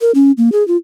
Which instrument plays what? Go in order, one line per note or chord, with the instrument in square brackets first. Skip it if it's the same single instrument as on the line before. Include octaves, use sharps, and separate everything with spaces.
[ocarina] A#4
C#4
A#3
G#4
F4